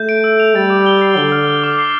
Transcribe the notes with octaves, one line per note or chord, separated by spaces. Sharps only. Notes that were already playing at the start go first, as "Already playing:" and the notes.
Already playing: A3 G6
D7
E6
F7
G3 A6
D6
G7
C7
D3 G7
F6
F6
D6
C7